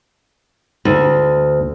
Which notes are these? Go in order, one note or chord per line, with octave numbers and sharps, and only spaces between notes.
D2